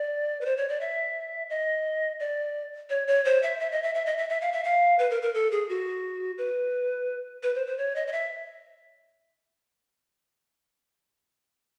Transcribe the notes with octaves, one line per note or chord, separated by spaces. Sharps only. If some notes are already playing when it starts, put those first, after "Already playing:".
Already playing: D5
B4
C5
C#5
D5
E5
D#5
D5
C#5
C#5
C5
E5
E5
D#5
E5
E5
D#5
E5
E5
F5
E5
F5
B4
A#4
A#4
A4
G#4
F#4
B4
B4
C5
C5
C#5
D#5
D#5
E5